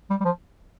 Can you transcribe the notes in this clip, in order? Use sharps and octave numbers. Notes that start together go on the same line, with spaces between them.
G3
G3
F3